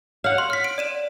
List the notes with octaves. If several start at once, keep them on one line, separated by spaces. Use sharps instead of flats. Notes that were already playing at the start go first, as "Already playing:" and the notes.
C#5 F5 F#5
C6
F6 B6
D7
D5 D#7 E7